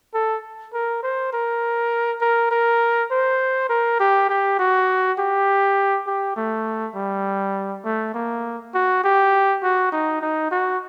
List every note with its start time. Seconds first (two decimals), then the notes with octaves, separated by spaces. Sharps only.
0.14 A4
0.74 A#4
1.03 C5
1.33 A#4
2.21 A#4
2.51 A#4
3.11 C5
3.70 A#4
4.00 G4
4.29 G4
4.59 F#4
5.19 G4
6.07 G4
6.37 A3
6.96 G3
7.85 A3
8.14 A#3
8.74 F#4
9.04 G4
9.63 F#4
9.92 D#4
10.22 D#4
10.52 F#4